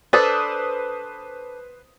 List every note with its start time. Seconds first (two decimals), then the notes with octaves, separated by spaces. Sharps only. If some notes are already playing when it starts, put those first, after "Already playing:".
0.13 D4 A4 B4 C5 D#6